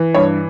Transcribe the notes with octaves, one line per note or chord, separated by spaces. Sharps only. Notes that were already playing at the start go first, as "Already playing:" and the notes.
Already playing: E3
G2 C#5